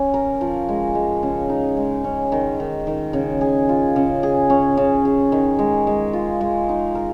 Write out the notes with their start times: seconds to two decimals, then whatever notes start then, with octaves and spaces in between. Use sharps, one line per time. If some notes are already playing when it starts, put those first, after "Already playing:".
Already playing: C#4
0.14 A#4
0.41 F3
0.69 G#3
0.95 G#3
1.23 C#3
1.50 D#4
1.77 G#3
2.04 C#4
2.32 D#3
2.60 D#3
2.87 D#3
3.13 C#3
3.41 G#4
3.69 F4
3.96 C#3
4.23 G#4
4.50 C#4
4.77 C#3
5.05 G#4
5.32 D#3
5.59 G#3
5.87 G#3
6.13 F4
6.41 G#3
6.69 D#4
6.95 A#4